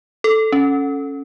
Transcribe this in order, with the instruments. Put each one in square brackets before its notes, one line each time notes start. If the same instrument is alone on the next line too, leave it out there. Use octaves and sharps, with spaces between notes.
[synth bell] A4
C#4